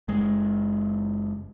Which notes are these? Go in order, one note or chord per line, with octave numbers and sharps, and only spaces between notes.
F#1 G#3